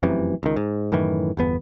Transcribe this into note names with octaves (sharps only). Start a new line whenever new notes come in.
F1 F#2 C3 E3
C#2 D#3
G#2
F#2 A2 D#3 E3
G1 E2 B3